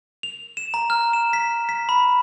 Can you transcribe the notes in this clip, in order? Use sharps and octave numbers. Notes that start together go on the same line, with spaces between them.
F7
E7
A#5
F6
E7
B6
B6
B5